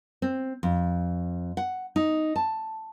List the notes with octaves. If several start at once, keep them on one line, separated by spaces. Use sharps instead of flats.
C4
F2
F#5
D#4
A5